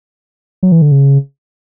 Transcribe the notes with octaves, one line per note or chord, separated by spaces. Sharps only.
F#3
E3
D3
C#3